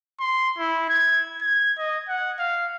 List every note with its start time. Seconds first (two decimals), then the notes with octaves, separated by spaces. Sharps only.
0.20 C6
0.58 E4
0.89 G#6
1.41 G#6
1.78 D#5
2.08 F#5
2.39 F5